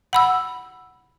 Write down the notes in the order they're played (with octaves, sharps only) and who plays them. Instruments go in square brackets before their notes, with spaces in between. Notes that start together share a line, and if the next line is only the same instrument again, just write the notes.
[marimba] F#5 B5 E6